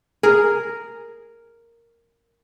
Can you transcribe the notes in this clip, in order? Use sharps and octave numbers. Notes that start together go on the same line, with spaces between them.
G#4 A#4